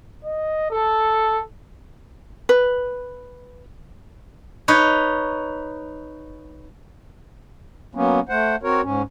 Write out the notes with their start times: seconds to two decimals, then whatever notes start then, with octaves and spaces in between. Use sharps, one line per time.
0.25 D#5
0.71 A4
2.49 B4
4.68 D#4 B4 C#5
7.95 F#3 A#3 B3 C#4
8.29 A3 C5 F#5
8.63 C4 F#4 A#4 C#5
8.83 G#2 C#4